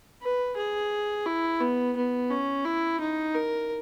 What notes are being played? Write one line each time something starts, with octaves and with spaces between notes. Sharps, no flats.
B4
G#4
E4
B3
B3
C#4
E4
D#4
A#4